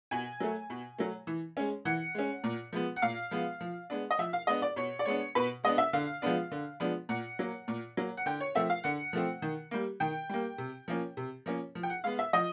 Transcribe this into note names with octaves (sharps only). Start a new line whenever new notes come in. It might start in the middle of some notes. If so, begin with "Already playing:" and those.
B2 G#5
F#3 A3
B2
F#3 A3
E3
G#3 C#4
E3 F#5
G#3 C#4
A#2
F3 G#3 B3
F#5
A#2 F5
F3 G#3 B3
F3
G#3 B3 D4
D#5
F3 E5
F5
G#3 B3 D4 D#5
D5
B2 C#5
D5
G#3 B3 D4 C#5
B2 B4
G#3 B3 D4 D#5
E5
D3 F5
F3 G#3 B3 D4
D3
F3 G#3 B3 D4
A#2 F#5
F#3 A#3
A#2
F#3 A#3
F#5
D3 G5
C#5
F3 A3 C4 E5
F5
D3 F#5
F3 A3 C4
D#3
G3 A#3
D#3 G5
G3 A#3
C3
F3 A#3 C#4
C3
F3 A#3 C#4
F3
G5
F#5
G#3 B3 F5
E5
F3 D#5